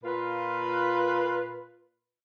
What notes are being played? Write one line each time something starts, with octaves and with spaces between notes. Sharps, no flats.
A#2 F4 B4